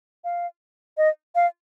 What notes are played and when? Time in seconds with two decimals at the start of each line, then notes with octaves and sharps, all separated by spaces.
0.24 F5
0.98 D#5
1.35 F5